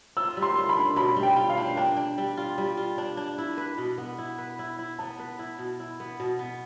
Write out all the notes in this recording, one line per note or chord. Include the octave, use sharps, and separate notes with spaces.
F4 E6
G3
C6
F4
B5
D4
B2 B5
G3
G5
F4
F5
D4
D4 G5
D4
G3
F4
G3
F4
D4
D4
E4
B4
B2
B3
E4
B4
E4
E4
B3 A5
B4
E4
B2
E4
B3
B2
B3